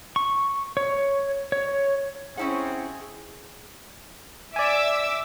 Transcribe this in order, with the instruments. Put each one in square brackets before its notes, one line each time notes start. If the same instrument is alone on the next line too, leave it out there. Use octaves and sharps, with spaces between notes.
[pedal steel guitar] C#6
C#5
C#5
[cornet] C4 [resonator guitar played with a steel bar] C#4 E4 F#5 [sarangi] G#4
[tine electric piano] D5 G#5 [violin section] E5 D6 E6